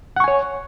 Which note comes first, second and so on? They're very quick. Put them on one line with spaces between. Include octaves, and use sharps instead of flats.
F#5 C#6 G#5 C#5